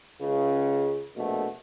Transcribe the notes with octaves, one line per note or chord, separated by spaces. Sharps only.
C#2 C#3
A#1 B2 A3